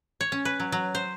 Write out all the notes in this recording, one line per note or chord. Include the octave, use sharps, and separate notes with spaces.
C#5
C#4
B4
F#3
F#3
C5